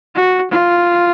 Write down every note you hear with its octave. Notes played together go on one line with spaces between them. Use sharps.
F#4
F4